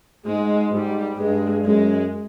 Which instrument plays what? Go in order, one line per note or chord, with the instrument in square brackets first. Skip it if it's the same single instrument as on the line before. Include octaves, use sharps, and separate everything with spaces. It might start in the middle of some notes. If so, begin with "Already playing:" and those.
[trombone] G#2 [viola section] G#3
[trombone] G#2 [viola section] G3
[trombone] G2 [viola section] G#3
[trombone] F#2 [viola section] G#3